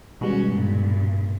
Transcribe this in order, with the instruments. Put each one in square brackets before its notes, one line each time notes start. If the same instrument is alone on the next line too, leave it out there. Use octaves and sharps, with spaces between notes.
[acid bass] B2 [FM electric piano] D#3 G3 G#3 [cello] C#4 F#4
[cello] G2 A#2